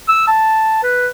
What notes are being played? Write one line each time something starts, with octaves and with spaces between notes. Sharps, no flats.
E6
A5
B4